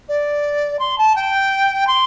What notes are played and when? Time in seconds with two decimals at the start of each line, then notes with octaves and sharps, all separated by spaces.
0.08 D5
0.79 C6
0.98 A5
1.15 G5
1.87 C6